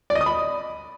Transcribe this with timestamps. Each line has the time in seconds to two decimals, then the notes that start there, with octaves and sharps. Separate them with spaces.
0.10 D5
0.15 D#5
0.21 D#6
0.26 B5